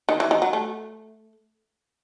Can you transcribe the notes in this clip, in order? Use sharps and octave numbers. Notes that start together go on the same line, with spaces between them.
D#3
E3
D#3
F#3
A3